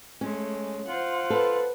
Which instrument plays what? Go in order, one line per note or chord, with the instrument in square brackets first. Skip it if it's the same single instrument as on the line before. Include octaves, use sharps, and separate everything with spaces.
[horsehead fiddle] G#3 A3 [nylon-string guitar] C#4
[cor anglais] F4 [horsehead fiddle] C5 F#5
[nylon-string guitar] A4 [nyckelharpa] B4